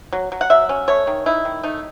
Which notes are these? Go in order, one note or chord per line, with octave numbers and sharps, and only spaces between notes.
F#3
F#3
F#5
F#3 E5
C#4
A3 C#5
D#3
D#4 E4
D#3
A3 D#4